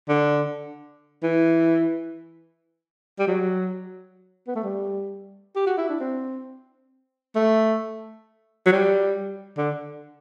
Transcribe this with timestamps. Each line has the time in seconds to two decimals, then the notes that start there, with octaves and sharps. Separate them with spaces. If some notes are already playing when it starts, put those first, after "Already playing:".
0.09 D3
1.23 E3
3.19 G3
3.28 F#3
4.48 B3
4.56 A3
4.64 G3
5.56 G4
5.67 F#4
5.78 E4
5.89 D4
6.00 C4
7.36 A3
8.66 F#3
8.72 G3
9.58 D3